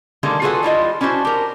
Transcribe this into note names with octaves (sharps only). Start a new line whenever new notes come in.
D3 D#3 G3 G#3 A#3
F4 F#4 G#4 A4 B4 F#5
G3 E4 F4 D#5
C#4 D4 E4 F#4 C5
G4 A#4